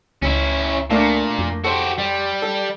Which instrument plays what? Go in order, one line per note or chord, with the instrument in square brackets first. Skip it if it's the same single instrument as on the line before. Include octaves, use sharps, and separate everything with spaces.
[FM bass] C#2 [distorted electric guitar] C#4 E4
[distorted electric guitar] A#2 [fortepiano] A3 A#3 D4
[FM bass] F2
[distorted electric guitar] F#4 G4 [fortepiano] A4 C5
[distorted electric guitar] G3
[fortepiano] A4